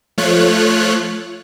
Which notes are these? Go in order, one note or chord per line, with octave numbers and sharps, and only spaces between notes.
F3 A3 F4 C#5 F#6